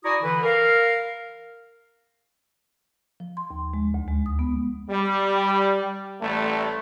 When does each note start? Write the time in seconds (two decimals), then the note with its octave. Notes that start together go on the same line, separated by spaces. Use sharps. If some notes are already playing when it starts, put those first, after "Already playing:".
0.04 E4 F#4 D5 G#5 A#5 D#6
0.22 D3 E3 B4
0.43 A#4 F5
3.20 F3
3.37 C6
3.50 D#2
3.74 G#3
3.94 D2
4.08 G#3
4.26 D#6
4.39 B3
4.90 G3
6.21 A1 G3 A3